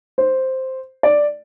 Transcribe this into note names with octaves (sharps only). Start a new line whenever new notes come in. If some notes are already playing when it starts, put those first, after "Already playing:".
C5
D5